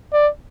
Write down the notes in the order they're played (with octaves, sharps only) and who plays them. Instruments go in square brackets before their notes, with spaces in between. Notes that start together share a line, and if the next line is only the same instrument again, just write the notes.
[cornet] D5